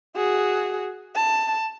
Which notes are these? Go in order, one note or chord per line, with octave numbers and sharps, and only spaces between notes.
F#4 G#4
A5